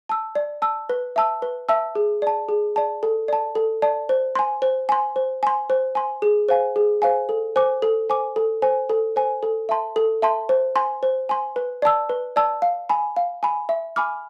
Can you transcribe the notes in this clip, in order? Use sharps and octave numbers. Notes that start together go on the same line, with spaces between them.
A5 E6
D5
A5 E6
B4
E5 A5 E6
B4
E5 A5 E6
G#4
D5 A5
G#4
D5 A5
A4
D5 A5
A4
D5 A5
C5
G#5 C6
C5
G#5 C6
C5
G#5 C6
C5
G#5 C6
G#4
C5 F5 G#5
G#4
C5 F5 G#5
A4
C5 G#5 D6
A4
C5 G#5 D6
A4
C5 G#5
A4
C5 G#5
A4
E5 A5 C6
A4
E5 A5 C6
C5
G#5 C6
C5
G#5 C6
B4
D5 A5 E6
B4
D5 A5 E6
F5
G#5 B5
F5
G#5 B5
E5
G#5 B5 D6 F6